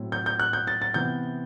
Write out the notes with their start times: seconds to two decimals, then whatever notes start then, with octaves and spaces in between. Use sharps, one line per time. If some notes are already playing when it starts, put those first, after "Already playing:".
Already playing: A2 F#3 C4
0.12 G6
0.26 G6
0.40 F#6
0.53 G6
0.67 A6
0.82 A6
0.94 C3 E3 B3 G6